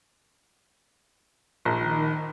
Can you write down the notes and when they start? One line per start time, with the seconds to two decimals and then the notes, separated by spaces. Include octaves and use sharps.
1.65 A#1 D#3